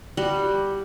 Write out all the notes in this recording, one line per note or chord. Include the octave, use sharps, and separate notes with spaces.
G3 F#4